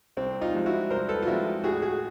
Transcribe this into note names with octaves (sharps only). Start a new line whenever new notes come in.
C2 C4
D#4 F4
C3 F3 G#3
E4 F#4
C2 A#4 C5
A4 B4
F4
C3 F3 G#3 E4 F#4
A2 F#4 G#4
F#4 G#4